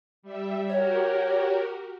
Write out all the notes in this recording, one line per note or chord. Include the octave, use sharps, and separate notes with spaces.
G3 E5
F#4 G4 A#4 C#5